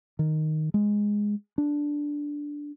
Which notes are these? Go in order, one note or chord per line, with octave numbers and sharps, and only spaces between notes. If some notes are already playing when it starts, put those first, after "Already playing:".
D#3
G#3
D4